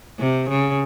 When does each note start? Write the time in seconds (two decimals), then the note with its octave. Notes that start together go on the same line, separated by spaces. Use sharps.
0.19 C3
0.49 C#3